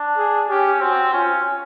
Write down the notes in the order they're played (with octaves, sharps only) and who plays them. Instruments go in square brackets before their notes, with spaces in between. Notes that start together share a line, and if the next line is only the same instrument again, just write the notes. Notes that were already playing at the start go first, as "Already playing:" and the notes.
Already playing: [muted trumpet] D4
[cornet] G#4
[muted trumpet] C#4 [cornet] G4
[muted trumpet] C4 [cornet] F#4
[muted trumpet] C#4 [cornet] F4